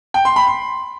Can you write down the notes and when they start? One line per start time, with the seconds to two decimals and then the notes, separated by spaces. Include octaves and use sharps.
0.14 G5
0.25 C6
0.36 B5
0.47 C6